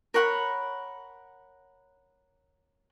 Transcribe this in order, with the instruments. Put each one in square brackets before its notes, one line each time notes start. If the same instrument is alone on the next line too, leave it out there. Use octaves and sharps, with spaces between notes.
[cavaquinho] A#4 C#5 F#5 B5